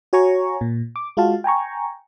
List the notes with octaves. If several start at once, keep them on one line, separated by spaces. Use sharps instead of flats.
F#4 C#5 G#5 A#5 C#6
A#2
D6
G#3 F4 F#4 F5 A5
G5 G#5 A#5 C#6